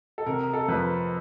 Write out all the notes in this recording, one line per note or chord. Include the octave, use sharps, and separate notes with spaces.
A4
C3 A#4
A4
A#4
F2 B4